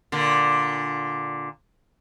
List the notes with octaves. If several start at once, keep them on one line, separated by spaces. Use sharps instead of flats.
A#2 D3